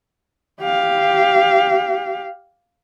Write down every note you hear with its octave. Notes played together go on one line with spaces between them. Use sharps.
G4 F5